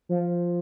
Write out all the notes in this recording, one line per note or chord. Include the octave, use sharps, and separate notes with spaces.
F3